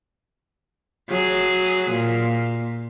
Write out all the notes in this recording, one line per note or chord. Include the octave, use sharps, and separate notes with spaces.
F#3 G#4
A#2